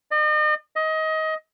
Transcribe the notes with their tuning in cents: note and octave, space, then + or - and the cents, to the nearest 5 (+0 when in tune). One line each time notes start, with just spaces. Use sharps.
D#5 -40
D#5 +25